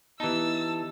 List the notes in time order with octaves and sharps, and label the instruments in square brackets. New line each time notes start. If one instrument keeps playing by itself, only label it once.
[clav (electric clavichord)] E3 D#4 [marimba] B3 G4 [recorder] A5 [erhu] E6